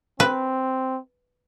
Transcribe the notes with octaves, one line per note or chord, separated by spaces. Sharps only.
C4 B4